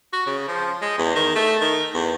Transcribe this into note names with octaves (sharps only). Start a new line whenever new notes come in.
F#4
C#3
F3
G#3
E2
D#3
A3
D#3
E2